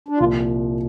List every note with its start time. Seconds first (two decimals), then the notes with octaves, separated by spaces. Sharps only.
0.08 D4
0.20 C2 A#2 F3 F4